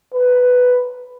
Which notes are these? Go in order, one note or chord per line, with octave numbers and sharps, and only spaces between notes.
B4